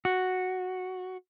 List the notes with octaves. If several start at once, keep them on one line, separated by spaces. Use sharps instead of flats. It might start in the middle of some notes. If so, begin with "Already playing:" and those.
F#4